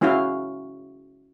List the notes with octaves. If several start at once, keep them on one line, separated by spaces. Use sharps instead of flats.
G#3 C#4 E4 F#4 F5